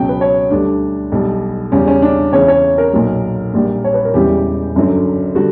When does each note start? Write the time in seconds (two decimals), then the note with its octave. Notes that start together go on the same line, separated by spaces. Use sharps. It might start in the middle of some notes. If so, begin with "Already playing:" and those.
Already playing: C#2 B2 F#3 G5
0.09 B4
0.21 C#5
0.50 D2 D3 G3 D4
1.12 B1 B2 G3
1.72 E2 C#3 G3 C#4
1.87 C#4
2.02 D4
2.33 E2 C#3 E3 C#5
2.48 C#5
2.78 A#4
2.93 B1 A#2 F#3
3.53 A#1 A#2 G3
3.84 C#5
3.94 B4
4.05 A#4
4.14 E1 E2 C#3 E3 G3 G4
4.76 G1 F#2 D3 F#3
5.35 D3 G3 F#4